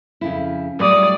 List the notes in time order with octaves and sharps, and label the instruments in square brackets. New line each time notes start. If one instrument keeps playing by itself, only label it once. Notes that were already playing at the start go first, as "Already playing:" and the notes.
[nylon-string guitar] F2 C#3 E4
[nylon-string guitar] A2 F#3 G3 [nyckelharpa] D5 D#6